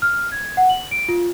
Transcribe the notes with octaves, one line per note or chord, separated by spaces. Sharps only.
F6
G#6
F#5
F#7
D7
F4